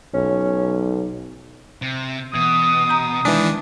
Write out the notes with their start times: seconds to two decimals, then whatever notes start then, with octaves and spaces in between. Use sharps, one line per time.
0.14 B1 C#4
1.82 C3
2.34 B2 E3 D#6
2.89 A#5 G6
3.25 D#3 E3 G#3 D4